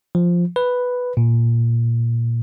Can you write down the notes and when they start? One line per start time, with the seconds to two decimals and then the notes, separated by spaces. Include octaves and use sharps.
0.15 F3
0.56 B4
1.17 A#2